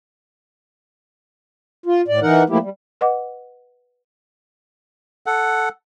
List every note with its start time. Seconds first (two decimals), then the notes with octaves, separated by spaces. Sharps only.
1.86 F4
2.08 A2 D5
2.22 E3 D#4 A#4 F#5
2.50 F3 A3 A#3 E4 G4
2.62 G3
3.01 B4 D#5 F#5 D6
5.26 A4 F#5